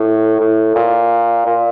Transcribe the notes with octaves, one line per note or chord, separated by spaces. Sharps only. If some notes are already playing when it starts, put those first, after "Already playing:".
Already playing: A2
A2
A#2
A#2